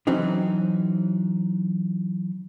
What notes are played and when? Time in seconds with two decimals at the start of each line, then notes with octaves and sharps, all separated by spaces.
0.07 E3 F#3 C4 C#4 D#4